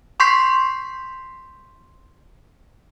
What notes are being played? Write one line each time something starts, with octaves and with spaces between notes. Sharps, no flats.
C6 C#6 G6 B6 C7